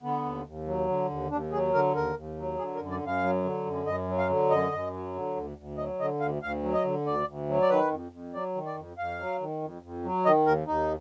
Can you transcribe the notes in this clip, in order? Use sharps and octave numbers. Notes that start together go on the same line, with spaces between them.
D3 B3
D#2
D#2
F#3
D3
D#2
D#2 D4
F#3 G#4
D3 A#4
D#2 A#4
D#2
F#3
D3 G#4
A#4
F#2
D5
F#2 F5
F#3
D3
F#2
F#2 D#5
F#3
F5
D3
F#2 D#5
F#2
F#3
D3
D2
D2
F#3 D#5
D3 D#5
D2 F5
D2 F5
F#3
D#5
D3
D2 D5
D2
F#3
D5
D#3 B4
F2
F2
F#3 D5
D#3
D5
F2
F2 F5
F#3
D#3
F2
F2
F#3
D#3 D#5
D#2 A#4
D#2 D#4